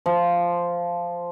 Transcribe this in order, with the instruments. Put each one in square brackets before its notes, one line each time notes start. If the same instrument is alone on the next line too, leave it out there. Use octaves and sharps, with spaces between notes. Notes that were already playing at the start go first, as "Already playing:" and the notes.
[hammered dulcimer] F3